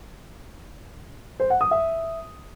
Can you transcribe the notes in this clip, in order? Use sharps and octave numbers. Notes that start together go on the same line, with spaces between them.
C5
F#5
D#6
E5